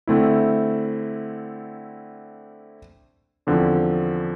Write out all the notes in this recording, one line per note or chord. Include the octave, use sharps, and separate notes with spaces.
D3 A3 C4 E4
E2 D3 F3 C4